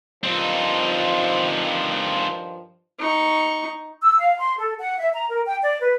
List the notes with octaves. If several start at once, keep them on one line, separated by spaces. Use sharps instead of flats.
G2 D#3 F3 C4 D#4
D#4 C#6
E6
F5
C6
A4
F#5
E5
A#5
A#4
G5
D5
B4